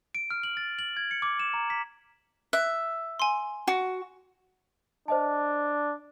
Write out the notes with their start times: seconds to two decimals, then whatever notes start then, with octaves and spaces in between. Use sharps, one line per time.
0.15 D7
0.30 F6
0.43 F#7
0.57 A6
0.79 F#7
0.97 G#6
1.11 C#7
1.22 D6
1.39 E7
1.54 A#5
1.70 B6
2.53 E5 F#6
3.20 G#5 C6
3.67 F#4
5.08 D4 C5 D#5 A5